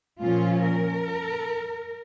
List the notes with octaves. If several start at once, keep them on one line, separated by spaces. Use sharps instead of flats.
A#2 F3 C#4 F4
A#4